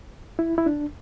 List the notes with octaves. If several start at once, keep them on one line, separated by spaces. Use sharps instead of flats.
E4
E4
D4